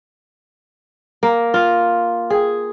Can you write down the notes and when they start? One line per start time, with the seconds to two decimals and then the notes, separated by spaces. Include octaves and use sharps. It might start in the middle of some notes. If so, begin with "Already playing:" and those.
1.23 A#3
1.54 F4
2.30 G#4